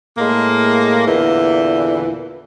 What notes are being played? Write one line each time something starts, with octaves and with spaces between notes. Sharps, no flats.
A2 G#3 A#3
E2 A#2 D3 E3